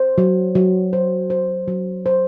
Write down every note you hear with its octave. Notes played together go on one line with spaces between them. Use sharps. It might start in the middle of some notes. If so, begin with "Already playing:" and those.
Already playing: C5
F#3
F#3
C5
C5
F#3
C5